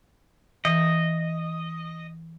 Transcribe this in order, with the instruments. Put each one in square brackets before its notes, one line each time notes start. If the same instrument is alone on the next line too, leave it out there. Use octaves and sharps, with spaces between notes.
[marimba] E3 [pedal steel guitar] D#5